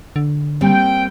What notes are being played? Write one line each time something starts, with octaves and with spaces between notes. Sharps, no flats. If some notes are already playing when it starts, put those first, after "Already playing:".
D3
G3 A#3 C4 G5